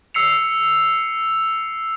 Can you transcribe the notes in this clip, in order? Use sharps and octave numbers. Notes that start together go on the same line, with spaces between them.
E6 C7 C#7 F7